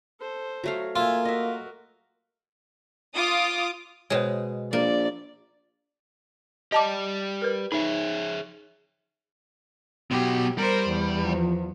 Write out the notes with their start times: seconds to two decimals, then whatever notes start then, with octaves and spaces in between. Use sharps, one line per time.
0.19 A4 C5
0.64 F#3 A3 F5
0.96 A#3 F4 E5 G#5
1.25 F#4 A#4 D#5 E5
3.15 F4 D6 D#6
4.10 B2 G#3 C5 C#5
4.73 A#1 A#3 D5
6.72 G4 D5 D#5 A5 D6
7.42 A#4 B4
7.72 D#4 G#4 C#5 E5
10.11 B2 F#3 G4
10.58 G3 A#4 C5
10.87 E2
11.25 F3